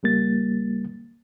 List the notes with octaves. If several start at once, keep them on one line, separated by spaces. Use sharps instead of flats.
C#2 G3 A#3 A6